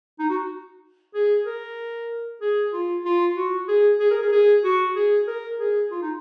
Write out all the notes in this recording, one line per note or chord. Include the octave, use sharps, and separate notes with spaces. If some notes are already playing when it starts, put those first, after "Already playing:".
D#4
F#4
G#4
A#4
G#4
F4
F4
F#4
G#4
G#4
A#4
G#4
G#4
F#4
G#4
A#4
G#4
F4
D#4